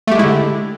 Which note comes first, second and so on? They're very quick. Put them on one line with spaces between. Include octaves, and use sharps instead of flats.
A3 G4 G#3 E4 D3